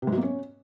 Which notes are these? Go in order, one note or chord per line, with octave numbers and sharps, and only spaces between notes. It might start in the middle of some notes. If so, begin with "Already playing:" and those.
C3
G#2
F#3
A#3
C#4